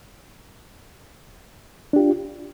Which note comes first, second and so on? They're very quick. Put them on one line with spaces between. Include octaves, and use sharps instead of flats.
D4 G4 F4